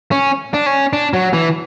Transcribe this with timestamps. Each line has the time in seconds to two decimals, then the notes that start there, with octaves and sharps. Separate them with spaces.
0.12 C#4
0.54 D4
0.66 C#4
0.93 D4
1.14 F#3
1.33 E3